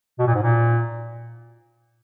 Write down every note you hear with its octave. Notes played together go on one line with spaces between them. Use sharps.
B2
A#2
G#2
A#2